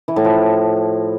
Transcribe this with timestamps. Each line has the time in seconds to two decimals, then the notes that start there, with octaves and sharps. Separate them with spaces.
0.08 E3
0.16 A2
0.25 F3